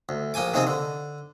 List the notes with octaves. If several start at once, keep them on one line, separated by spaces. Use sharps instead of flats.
D2
A#1 A#3 G5 G#5 D6
C3 D#3 A#3 C4 G#4
D3